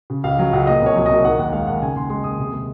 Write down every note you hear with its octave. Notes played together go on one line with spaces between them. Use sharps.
C#3
C#2 F5
F#3
C#2 F#5
A#2 D#5
C2 C#5
F#3
C2 D#5
D#3 F#5
D#2 F#5
G#3 F5
D#2 F#5
C#3 G#5
D#2 C6
G#3 C6
D#2 D#6
C3
G#3